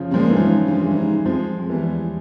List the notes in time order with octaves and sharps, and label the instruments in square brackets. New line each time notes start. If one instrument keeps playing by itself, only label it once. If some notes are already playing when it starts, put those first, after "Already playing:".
Already playing: [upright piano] C#3 F3
[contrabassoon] C3
[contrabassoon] A#2 [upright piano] F3 G#3
[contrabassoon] G2 [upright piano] E3
[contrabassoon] G#2 [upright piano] C#3 F3
[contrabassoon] G2
[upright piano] F3
E3 G3
[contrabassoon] G2
G#2
[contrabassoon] F2 [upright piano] F3 G#3
[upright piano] G#3
[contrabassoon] E2 [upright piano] E3 G3